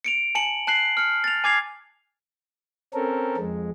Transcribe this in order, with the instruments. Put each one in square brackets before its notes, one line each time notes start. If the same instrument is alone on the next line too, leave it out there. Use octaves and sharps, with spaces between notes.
[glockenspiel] C#7 D7 F7
G#5 A5 C#7 F#7
A5 F#6 C7 F#7
F6 C#7
A6 F7
G#5 D6 G#6 C7 F7
[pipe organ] C4 C#4 A4 A#4
F2 G#3